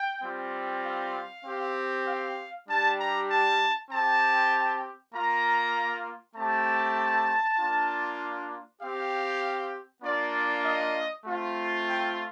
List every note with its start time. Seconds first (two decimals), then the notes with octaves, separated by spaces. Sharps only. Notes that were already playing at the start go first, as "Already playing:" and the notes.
Already playing: G5
0.23 G3 C4 F4
0.84 F5
1.45 C4 G4
2.07 F5
2.67 G3 D4 G4 A5
2.98 A#5
3.29 A5
3.90 C4 G4 A5
5.12 A#3 F4 A#5
6.35 A3 C4 G4 A5
7.57 A#3 D4 F4
8.80 C4 G4 F5
10.03 A#3 D4 F4 D5
10.64 D#5
11.26 A3 C4 F4
11.86 G5